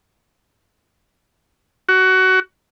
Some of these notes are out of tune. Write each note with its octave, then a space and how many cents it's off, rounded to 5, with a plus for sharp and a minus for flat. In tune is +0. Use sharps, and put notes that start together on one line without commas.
F#4 +20